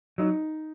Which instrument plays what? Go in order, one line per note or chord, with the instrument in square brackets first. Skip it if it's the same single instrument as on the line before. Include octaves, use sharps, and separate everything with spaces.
[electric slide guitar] F#3 [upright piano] D#4